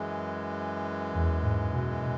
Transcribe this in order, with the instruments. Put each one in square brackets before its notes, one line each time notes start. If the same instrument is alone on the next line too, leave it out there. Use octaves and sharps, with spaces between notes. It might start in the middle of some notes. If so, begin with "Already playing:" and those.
Already playing: [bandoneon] F#2 E3 G#3
[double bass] E2
G#2
B2